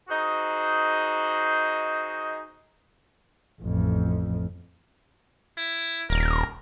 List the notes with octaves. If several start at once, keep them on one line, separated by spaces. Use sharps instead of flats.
D#4 F#4 G#4 C5 D#5
A1 F2
E4
D#1 A#4